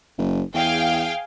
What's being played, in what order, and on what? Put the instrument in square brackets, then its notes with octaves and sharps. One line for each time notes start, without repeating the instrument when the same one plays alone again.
[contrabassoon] F#1
[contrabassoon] E2 [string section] G#4 F5 G5